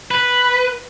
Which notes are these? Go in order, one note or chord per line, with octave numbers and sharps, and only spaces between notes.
B4